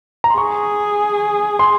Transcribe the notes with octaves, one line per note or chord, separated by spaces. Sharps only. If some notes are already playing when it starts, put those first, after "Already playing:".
A#5
C6
G#4 C#6
C6